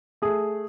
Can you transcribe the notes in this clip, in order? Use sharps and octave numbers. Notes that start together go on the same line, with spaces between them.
A3 G#4